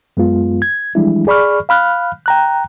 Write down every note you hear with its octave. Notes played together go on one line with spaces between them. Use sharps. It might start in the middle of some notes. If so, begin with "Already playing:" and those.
F#2 G#3 B3 F4
G#6
E3 F3 G3 G#3 D4 E4
G#4 D5 B5 C#6 F6
F5 B5 F6 F#6
G5 A#5 F#6